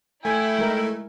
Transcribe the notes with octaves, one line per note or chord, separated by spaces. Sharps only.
A3 E4 G5 G#5
G#3 A#4